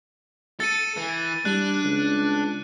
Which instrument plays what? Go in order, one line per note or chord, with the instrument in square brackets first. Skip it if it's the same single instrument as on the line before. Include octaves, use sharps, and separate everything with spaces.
[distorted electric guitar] A4 [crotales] A6 C#7 D#7
[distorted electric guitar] E3
[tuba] G3 [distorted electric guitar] D4 [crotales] F#6
[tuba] C#2